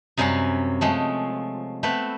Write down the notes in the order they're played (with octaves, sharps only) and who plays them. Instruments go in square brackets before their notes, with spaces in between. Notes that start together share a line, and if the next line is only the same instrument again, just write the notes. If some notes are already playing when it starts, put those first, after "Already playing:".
[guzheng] F#2 C3 G3 C#4 F5 F#5
F3 G#3 A3
A3 B3 C4 B4